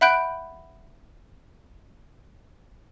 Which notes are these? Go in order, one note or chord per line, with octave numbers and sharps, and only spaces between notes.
E5 F#5 B5 F#6 G6 D7